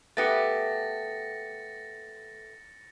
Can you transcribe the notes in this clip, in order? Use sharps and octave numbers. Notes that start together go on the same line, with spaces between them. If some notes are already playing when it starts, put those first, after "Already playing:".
A3 B3 G4 A6 A#6 C#7